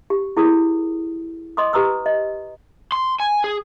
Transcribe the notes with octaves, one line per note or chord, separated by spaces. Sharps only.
G4
E4 G#4 A#4 D#6
D#5 C6 D6 D#6
G4 B4 A#5 D#6 E6
D#5
C6
G#5
G#4